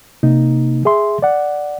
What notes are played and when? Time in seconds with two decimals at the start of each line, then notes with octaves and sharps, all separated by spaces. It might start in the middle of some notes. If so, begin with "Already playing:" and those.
0.23 C3 A#3 D#4
0.85 G#4 E5 C6
1.22 D5 F#5